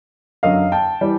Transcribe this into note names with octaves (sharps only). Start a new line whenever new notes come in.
F#2 D3 F#3 D#5 F5
G5 A5
E3 G3